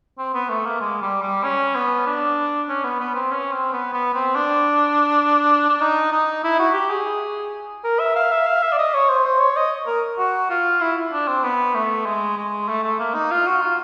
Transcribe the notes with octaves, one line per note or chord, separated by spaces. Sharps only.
C4
B3
A3
A#3
G#3
G3
G3
C#4
B3
D4
C#4
B3
B3
C4
C#4
C4
B3
B3
C4
D4
D4
D#4
D#4
E4
F#4
G4
G#4
A#4
E5
F5
E5
F5
E5
D5
D#5
C#5
C5
C5
C#5
D#5
A#4
F#4
F4
E4
D4
C4
B3
A3
G#3
G#3
A3
A3
A#3
D#4
F4
F#4
F4